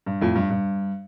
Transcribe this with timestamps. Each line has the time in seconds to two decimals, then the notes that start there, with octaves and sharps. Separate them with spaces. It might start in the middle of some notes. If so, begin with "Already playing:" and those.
0.06 G2
0.21 F2 A2
0.35 G2
0.50 G2